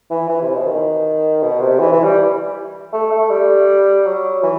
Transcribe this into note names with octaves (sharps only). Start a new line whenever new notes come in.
E3
E3
C3
B2
D#3
B2
C3
E3
E3
G3
A3
A3
G3
F#3
E3